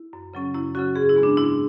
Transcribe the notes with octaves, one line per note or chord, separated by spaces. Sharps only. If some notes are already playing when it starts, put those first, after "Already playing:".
Already playing: E4
F#2
C#3 F#3 C#4
F#2 E4
C#3 F#3 C#4 F#4
G#2 G#4
E4
G#3 B3
D4
G#2 E4